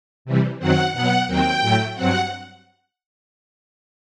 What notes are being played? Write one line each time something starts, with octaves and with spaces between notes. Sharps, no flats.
C3 E3 G3
F#2 D#3 F#3 C4 F#5
B2 F#3 B3 F#5
D#2 D#3 F#3 C4 G5
A2 F#3 A3
G2 F#3 C4 F#5